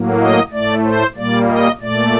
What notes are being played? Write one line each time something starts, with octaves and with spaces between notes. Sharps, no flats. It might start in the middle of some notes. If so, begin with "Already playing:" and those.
Already playing: A2 F#3 A#3
D#5
A2 A3 D5
C5
A#2 G3 A#3 D5
D#5
A#2 A3 D5